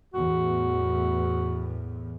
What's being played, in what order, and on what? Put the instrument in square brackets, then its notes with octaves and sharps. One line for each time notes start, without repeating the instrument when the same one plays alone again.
[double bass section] E2 A2 [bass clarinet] F#4